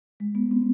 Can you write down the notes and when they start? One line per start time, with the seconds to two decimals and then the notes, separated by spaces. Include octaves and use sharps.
0.20 G#3
0.35 B3
0.51 C4